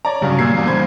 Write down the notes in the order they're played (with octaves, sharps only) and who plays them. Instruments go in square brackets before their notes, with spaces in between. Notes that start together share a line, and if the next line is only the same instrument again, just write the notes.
[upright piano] C#5 D5 A#5
[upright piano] G2 F#3 [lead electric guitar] C#3
[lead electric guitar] A#2 [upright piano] E6 G#6 C7
[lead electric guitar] E2 G3
[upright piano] C5 B5 G#6